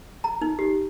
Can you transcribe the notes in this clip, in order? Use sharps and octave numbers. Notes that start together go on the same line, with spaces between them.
A#5
D#4
G4